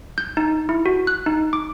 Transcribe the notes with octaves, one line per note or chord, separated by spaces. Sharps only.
G6
D#4
E4
F#4
F#6
D#4
D6